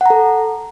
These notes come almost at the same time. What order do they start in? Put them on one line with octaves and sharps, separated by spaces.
F#5 A#5 A4